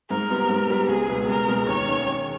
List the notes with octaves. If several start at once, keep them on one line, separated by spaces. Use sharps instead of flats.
G#2 A#4
G3 B3
G#2
G3 B3
C#2 G#4
B2 G#3 B3
C#2 A#4
B2 G#3 B3
D#2 C#5
D#3 A#3 C#4
D#2